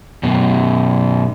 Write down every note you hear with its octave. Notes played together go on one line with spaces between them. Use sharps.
F#2 B2